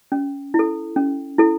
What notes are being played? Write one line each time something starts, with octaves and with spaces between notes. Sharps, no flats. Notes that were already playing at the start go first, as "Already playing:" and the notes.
C#4
E4
A4
C#4
E4 A4